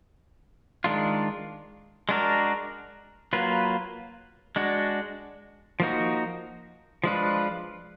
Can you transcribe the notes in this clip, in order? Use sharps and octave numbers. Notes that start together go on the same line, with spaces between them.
D#3 G#3 D4 F4
G#3 D4 F#4 A#4
F#3 A#3 F4 B4
G#3 D4 F#4
F3 A#3 D#4 F#4
F3 G#3 D4 F4 B4